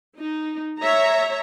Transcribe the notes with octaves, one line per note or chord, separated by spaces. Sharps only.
D#4
C#5 E5 A#5